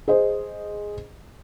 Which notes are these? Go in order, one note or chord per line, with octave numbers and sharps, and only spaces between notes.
G#4 C5 D#5